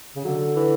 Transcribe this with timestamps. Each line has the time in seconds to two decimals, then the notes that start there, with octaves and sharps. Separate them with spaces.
0.16 C#3
0.24 D3 F#3
0.56 E3